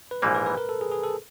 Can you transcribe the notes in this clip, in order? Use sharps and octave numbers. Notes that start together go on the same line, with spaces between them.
B4
A#1 G#2 E3 G3 A#3 C5
B4
B4
A#4
A4
G#4
G#4
A4